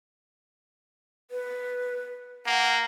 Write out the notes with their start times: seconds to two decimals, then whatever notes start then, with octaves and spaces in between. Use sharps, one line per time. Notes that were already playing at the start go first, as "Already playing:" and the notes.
1.31 B4
2.46 A#3 F#5